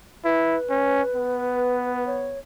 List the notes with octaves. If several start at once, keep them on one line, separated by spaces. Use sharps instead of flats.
E4 B4
C#4
B3
C#5